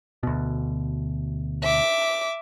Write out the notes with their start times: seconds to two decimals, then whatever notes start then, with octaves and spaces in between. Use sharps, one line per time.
0.23 D2 B2
1.63 E5 D6